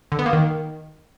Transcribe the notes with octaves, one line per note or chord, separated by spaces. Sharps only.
D3
B3
A#3
D#3